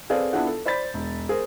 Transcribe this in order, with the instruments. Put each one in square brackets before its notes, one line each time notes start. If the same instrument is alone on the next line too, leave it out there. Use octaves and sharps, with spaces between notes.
[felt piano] C4 G#4 A4 B4 D5 F5
B3 D4 E4 F4 G#4 F#5
A4
C5 D5 B5 G6 A6 B6
E1
G#4 A#4 C5